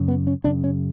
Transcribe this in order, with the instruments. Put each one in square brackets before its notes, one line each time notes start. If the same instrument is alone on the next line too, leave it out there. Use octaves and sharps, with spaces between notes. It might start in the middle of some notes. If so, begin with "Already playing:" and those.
Already playing: [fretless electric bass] F#2 C#3
B3
C#4
F#2 C#3 D4
C#4